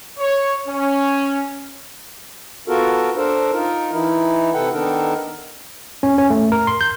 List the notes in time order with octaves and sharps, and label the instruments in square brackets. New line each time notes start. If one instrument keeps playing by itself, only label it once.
[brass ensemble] C#5
C#4
[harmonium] B3 F4 F#4 A4 A#4
D4 A4 A#4 C5
D#4 F4 A#4
E3 D#4 E4
C3 A4 B4 F#5 G5
D#3 B3 D4 D#4 A4 A#4
[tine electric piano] C#4
C#4
A3
A#4
C6
G6